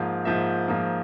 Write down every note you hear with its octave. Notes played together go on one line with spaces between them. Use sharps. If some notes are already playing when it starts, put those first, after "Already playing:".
Already playing: G#2 F3 A#3 F5
G#2 F3 A#3 E5
G#2 F3 A#3